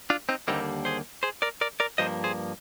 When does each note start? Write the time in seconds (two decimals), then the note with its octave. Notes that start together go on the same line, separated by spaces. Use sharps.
0.10 D4 F4
0.29 C4 D#4
0.48 D#2 D3 G3 A#3 C4 D#4
0.85 G#4 C5
1.23 G#4 C5
1.42 A#4 D5
1.61 A#4 D5
1.80 A#4 D5
1.98 G2 F3 A#3 C5 D#5
2.24 G#4 C5